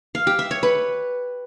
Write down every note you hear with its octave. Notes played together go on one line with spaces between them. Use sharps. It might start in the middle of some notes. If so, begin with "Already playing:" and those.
F5
G4
E5
C#5
B4